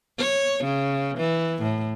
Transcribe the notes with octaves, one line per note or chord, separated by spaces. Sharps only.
C#5
C#3
E3
A2